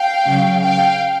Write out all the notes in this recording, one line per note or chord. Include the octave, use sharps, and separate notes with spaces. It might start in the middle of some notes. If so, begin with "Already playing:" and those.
Already playing: F5 G5
C#3 F#3
F5 G5